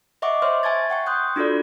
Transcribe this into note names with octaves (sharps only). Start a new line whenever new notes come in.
D#5 E5 F#5 C#6 D6
C5 C#5 E5 C6 F6
E5 G#5 A5 C#6 G#6 A6
F#5 G5 C#6
C6 D#6 F#6 G6
D4 F4 F#4 A4 D5